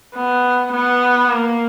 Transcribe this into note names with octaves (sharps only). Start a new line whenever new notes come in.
B3
B3
A#3